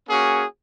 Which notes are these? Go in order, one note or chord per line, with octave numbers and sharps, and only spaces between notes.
A#3 C#4 F#4 G#4